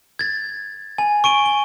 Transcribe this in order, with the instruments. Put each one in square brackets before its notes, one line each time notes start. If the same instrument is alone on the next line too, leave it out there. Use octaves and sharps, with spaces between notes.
[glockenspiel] G#6 A6
G#5
C#6 D7 D#7 G7
G7